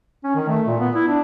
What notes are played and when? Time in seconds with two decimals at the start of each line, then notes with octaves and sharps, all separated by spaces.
0.24 C#4
0.35 D#3
0.48 A3
0.67 A#2
0.80 B3
0.95 E4
1.07 D4